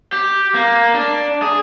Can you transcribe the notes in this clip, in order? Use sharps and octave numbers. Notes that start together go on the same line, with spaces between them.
G4
A#3
D4
G#4